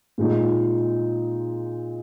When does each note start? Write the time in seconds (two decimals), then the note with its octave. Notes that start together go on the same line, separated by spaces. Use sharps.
0.18 A#2 G#3 D#4